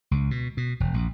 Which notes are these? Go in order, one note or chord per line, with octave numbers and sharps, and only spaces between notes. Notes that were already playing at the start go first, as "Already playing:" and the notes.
C#2
B2
B2
E1
A#1